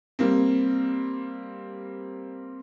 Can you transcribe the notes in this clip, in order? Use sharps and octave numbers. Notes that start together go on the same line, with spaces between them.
G3 A#3 C4